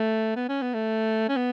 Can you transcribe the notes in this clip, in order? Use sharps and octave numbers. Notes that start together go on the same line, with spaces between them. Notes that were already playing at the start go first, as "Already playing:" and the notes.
Already playing: A3
B3
C#4
B3
A3
C#4
B3